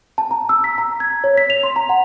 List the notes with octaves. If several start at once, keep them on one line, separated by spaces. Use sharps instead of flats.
A5
A#5
E6
B6
A#5
G#6
C#5
B6
F7
C6
A#5
F#5